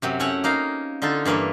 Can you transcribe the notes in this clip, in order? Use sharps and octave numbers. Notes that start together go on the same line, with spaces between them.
F#2 C3 F#3
A3 C#4 E4 C#5 F#5
A#3 D#4 F5 A#5
D3 D#4 F4 A4
G2 E3 A#3 B4 C#5